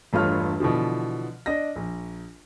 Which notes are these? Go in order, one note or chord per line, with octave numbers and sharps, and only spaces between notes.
E1 G2 A3 F4 C#5 F6
B2 D3 E3 F3
D4 D#5 A#6
A#1